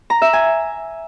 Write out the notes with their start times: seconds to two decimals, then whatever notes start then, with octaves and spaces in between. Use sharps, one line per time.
0.10 A#5
0.22 E5
0.33 G#5